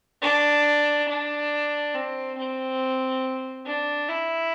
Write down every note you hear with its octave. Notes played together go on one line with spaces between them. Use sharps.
D4
D4
C4
C4
D4
E4